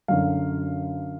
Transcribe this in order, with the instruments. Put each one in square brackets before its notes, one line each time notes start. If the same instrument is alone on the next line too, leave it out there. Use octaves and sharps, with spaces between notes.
[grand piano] F#2 D3 F#3 F5